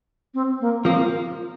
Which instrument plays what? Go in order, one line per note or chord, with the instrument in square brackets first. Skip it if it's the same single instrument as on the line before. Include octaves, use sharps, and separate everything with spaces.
[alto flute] C4
A#3
[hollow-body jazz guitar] F3 A#3 [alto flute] C4
[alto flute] F4